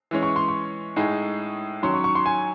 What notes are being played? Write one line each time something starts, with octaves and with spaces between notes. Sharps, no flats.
E3 G#3 C#4
C#6
C6
C#6
A2 G#3 D#4 G#4
D#3 F#3 C#4 C6
C#6
C#6
C6
G#5